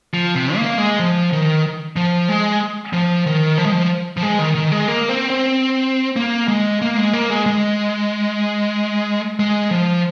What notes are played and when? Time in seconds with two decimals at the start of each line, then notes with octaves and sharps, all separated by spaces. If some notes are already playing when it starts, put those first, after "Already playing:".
0.14 F3
0.35 C3
0.56 A#3
0.78 G#3
0.99 F3
1.33 D#3
1.96 F3
2.29 G#3
2.93 F3
3.26 D#3
3.58 F3
3.66 G#3
3.72 F3
4.17 F3
4.23 G#3
4.39 D#3
4.55 D#3
4.72 G#3
4.88 A#3
5.09 C4
5.30 C4
6.16 A#3
6.48 G#3
6.81 A#3
6.97 G#3
7.13 A#3
7.30 G#3
7.46 G#3
9.40 G#3
9.71 F3